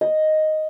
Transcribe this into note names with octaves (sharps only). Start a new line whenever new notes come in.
D#5